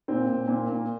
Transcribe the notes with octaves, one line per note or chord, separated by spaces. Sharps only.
A#2 C4
A#2
A#2
A#2